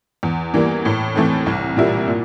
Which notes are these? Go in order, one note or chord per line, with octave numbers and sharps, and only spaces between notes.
E2
E3 G3 A#3
A2
E3 A3 C4
C2
A#2 G3 A#3 E4
A#2